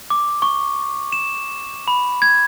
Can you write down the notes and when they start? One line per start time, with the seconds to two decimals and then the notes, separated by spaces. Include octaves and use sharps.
0.10 D6
0.42 C#6
1.12 E7
1.88 B5
2.22 G#6